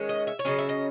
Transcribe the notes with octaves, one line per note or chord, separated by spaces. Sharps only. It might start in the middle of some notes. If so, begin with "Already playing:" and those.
Already playing: D#3 G#3 C#4
D#5
E5
C#5
C#3 F#3 C#4 D#5
E5
D#5